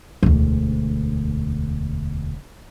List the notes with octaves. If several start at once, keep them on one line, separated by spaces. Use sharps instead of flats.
E1 D2